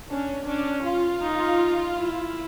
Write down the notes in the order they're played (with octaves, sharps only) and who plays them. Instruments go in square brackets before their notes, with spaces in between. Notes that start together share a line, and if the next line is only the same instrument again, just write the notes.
[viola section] C#4 [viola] D4
[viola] C#4 [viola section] D4
[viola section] F4
[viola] D#4
E4